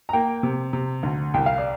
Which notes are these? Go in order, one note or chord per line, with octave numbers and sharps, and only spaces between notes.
A#5
A#3 G5
C3
C3
D2
C2 G5
F5
D5